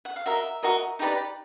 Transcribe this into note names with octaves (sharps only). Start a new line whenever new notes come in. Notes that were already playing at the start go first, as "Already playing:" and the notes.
F#5
F5
F#4 A#4 D#5 E5
F#4 A#4 D#5
D#4 G4 B4 D5